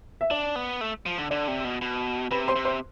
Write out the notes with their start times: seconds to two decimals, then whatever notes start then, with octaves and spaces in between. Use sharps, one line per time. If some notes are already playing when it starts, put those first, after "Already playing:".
0.21 E5
0.31 D4 D5
0.56 B3
0.81 A3
1.06 F3
1.18 D3
1.30 D3 D5
1.48 C3
1.64 B2
1.81 B2
2.31 C3 B4 B5
2.48 C5 C6
2.56 C3
2.65 C5 C6